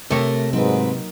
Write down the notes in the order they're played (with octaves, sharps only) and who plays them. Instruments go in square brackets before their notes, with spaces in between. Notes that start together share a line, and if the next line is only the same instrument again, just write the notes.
[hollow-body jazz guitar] C3 C#5 [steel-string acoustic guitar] A3 A#4
[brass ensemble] G#2 [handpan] F#3 A#3 D#4 [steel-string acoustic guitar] C4 B4